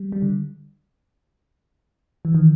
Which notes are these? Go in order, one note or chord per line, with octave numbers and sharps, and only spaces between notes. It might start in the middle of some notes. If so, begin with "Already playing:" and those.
Already playing: G3
G3
D3
E3
D#3